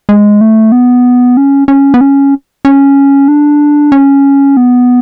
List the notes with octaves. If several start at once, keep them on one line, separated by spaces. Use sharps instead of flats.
G#3
A3
B3
C#4
C#4
B3
C#4
C#4
D4
C#4
B3